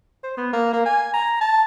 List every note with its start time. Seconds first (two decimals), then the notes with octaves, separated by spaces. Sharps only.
0.24 C5
0.37 B3
0.53 A#3
0.73 A#3
0.86 G#5
1.13 A#5
1.41 A5